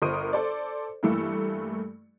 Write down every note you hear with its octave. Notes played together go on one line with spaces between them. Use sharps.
G1 A#4 C5 D#6 D7 D#7
A4 C5 D5
G2 E3 A3 A#3 E6 C#7